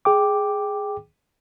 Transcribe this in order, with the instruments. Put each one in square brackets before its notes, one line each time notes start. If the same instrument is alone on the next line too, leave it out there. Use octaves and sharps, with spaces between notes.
[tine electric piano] G#4 G5 D6